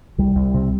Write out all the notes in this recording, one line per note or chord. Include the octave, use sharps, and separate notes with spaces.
C2 G3
C2
C3